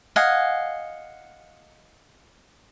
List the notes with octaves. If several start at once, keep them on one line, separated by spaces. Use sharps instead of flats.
D#5 F5 F#5 G#5